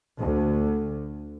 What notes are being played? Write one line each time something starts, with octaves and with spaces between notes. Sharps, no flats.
D2